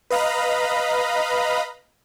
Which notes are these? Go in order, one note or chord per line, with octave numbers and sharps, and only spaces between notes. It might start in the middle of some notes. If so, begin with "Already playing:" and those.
B4 D#5 F5 A#5 B5